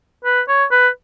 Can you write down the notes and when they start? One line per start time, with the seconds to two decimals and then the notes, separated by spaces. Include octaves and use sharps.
0.25 B4
0.48 C#5
0.72 B4